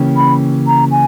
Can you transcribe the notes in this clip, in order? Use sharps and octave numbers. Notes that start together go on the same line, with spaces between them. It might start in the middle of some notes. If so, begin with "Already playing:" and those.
Already playing: C#3 E3 A#3 C#4 G4
B5
A#5
G#5